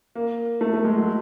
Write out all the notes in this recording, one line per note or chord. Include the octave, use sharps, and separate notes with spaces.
A#3
A3
A3
G#3
F#3